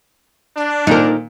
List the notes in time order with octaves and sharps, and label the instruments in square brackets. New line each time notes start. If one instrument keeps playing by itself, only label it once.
[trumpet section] D4
[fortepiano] A#2 D#3 [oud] D#4 A#4